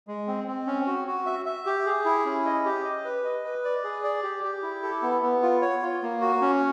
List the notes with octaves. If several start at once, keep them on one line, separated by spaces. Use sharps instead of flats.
G#3
C4
C4
C#4
F#4
F#4
E5
E5
G4
G#4
E4
C#4
D#5
G4
D#5
B4
D#5
B4
D5
G#4
D5
G4
G4
E4
A4
B3
B3
F4
C#5
F4
A#3
F#4
C#4